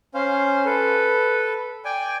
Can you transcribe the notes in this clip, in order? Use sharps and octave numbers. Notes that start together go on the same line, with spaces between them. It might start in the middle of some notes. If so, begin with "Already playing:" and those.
C#4 C5 F5
A4 B4
D5 G5 G#5